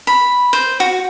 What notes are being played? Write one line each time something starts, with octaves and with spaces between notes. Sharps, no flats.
B5
C5
F#4